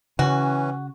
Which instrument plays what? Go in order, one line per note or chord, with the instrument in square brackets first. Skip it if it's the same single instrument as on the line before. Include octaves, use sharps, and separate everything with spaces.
[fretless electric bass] C#3 [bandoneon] E3 C#4 [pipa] F#4